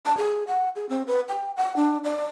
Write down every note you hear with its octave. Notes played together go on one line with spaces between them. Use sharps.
A5
G#4
F#5
G#4
C4
B4
G5
F#5
D4
D5